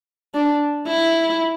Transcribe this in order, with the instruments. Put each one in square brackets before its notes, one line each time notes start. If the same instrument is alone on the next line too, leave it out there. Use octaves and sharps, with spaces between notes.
[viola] D4
E4